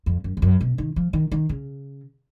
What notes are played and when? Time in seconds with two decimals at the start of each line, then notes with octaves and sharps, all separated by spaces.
0.06 F2
0.24 F#2
0.37 F2
0.42 F#2
0.61 B2
0.78 D#3
0.96 F3
1.13 D#3
1.32 D#3
1.49 C#3